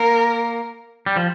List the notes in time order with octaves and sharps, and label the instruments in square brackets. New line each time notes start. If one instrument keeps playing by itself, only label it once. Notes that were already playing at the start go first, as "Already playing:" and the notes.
Already playing: [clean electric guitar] A#3 [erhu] A#4
[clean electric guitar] G3
F3